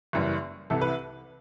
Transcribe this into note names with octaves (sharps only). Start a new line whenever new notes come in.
F#1 F#2 E3 G3
C2 C3 E3 A4
B4